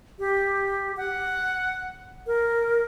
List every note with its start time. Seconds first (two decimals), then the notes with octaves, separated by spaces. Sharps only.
0.19 G4
0.97 F#5
2.27 A#4